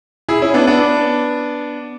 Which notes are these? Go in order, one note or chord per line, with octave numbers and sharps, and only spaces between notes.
E4 G#4
C#4 E4
B3 D4
B3 D4